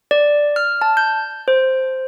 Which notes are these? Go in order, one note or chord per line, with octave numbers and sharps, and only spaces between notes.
D5
F6
A5
G6
C5